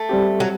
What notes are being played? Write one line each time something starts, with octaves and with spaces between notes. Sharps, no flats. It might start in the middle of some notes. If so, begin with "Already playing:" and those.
Already playing: A3
G3 C4 G4
F#3